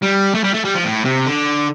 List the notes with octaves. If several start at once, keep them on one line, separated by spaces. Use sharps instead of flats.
G3
A3
G3
A3
G3
F3
A2
C3
D3